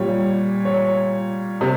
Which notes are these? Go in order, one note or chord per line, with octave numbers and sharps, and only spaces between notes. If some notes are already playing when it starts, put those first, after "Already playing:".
Already playing: A#2 G3 C#5
C#5
C3